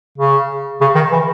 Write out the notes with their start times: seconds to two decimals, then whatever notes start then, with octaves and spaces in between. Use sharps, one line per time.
0.18 C#3
0.81 C#3
0.95 D#3
1.12 E3